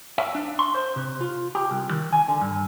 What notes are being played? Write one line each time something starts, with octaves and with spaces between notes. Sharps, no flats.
E5
D4
C6
C5
C3
F4
G4
C2
D#3
G#5
D3
G2